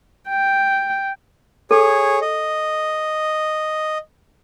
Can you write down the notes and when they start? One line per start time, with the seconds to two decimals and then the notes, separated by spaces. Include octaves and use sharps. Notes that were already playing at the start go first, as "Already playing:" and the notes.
0.28 G5
1.71 G#4 A4 C#5
2.21 D#5